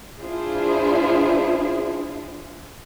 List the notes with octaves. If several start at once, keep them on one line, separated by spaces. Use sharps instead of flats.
D4 E4 F4 G#4 C5